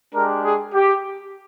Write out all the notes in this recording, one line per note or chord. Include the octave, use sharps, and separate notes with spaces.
G#3 D4 G4 A#4
G#4
G4